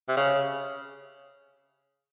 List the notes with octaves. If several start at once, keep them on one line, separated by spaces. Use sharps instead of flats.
C3
C#3